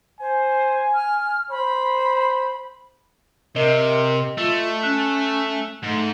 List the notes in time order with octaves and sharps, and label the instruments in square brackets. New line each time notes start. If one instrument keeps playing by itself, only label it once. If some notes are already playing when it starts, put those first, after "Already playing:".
[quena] C5 [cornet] G#5
[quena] F6
[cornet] C5 [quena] B5
[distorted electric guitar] C3 [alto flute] A#4 [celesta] D#5 G7
[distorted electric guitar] A3 [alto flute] F4
[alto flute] C#4 [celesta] F#6
[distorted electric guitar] G#2 [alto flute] A3